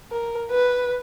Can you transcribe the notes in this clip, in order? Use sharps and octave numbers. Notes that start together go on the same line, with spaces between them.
A#4
B4